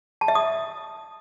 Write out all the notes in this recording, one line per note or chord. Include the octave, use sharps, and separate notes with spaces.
A5
E5
D#6